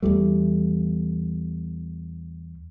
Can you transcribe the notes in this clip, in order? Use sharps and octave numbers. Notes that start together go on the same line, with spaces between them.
E2 E3 G3 A3